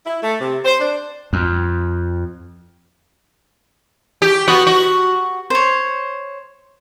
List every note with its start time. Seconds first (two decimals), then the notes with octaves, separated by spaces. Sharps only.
0.06 E4
0.23 A3
0.41 C3
0.65 C5
0.80 D4
1.33 F2
4.22 G4
4.48 B3 F#4
4.67 F#4
5.50 C5 C#5